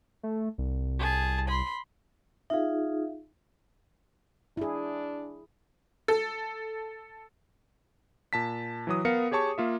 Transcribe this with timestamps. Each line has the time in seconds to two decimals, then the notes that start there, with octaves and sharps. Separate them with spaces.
0.23 A3
0.58 C2
1.00 G#4 A5
1.48 B5 C6
2.50 D#4 F4 G#4 E5 F5
4.57 D4 E4 G#4
6.08 A4
8.33 A#2 A5 B6
8.87 E3 F#3 D#6
9.05 B3 A#4 F5 C#7
9.31 G4 G#4 C#5 A5 C#6
9.58 A#3 F4 E5